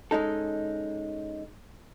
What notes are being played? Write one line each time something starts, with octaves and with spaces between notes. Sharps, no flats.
G#3 C#4 D#4 A4